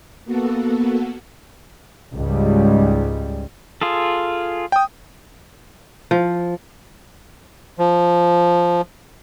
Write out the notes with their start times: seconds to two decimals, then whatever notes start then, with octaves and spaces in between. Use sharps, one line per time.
0.25 A#3 B3 F#4 A4
2.15 C#2 G#2 G3
3.81 F4 G#4 A4
4.72 G5 D#6
6.11 F3
7.79 F3